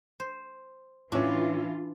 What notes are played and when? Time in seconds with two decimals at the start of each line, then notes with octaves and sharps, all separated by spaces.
0.20 C5
1.12 A2 E3 C#4 D4 F4